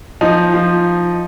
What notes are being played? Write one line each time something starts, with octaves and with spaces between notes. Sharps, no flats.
F3 D#4
F3